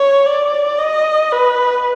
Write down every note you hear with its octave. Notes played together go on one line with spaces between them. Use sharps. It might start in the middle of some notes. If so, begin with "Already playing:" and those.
Already playing: C#5
D5
D#5
B4